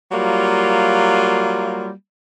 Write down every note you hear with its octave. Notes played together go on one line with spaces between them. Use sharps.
F#3 G3 A#3 F4